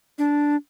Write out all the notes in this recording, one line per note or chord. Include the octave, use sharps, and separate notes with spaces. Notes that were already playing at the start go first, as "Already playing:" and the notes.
D4